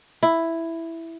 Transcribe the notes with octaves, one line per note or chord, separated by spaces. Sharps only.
E4